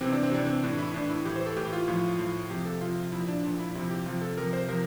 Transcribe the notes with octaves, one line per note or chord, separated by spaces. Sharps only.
C3 E3 C4
D4
C4
C3 E3 D4
C4
A2 E3 D4
E4
A2 E3 D4
E4
A2 E3 G4
C5
A4
A2 E3 G4
F4
A2 F3 F4
A2 F3
C3 F3 G4
A4
C3 F3 F4
A#2 F3 E4
D4
A#2 F3 D4
E4
C3 F3 E4
G4
C3 F3 F4
A4
C3 F3 A#4
C5
C3 F3 A#4